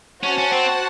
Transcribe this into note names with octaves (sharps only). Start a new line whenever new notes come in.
C#4 F#4 C5 F#5 A5
C#4
C4